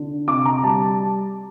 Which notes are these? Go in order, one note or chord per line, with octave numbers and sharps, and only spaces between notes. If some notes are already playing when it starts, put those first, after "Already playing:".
Already playing: D3
C3 D6
A#5
G3 A5